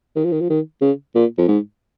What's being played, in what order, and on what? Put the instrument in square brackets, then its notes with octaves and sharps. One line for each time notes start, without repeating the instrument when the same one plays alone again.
[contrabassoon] D#3
F3
D#3
F3
D#3
C#3
A#2
F2
G#2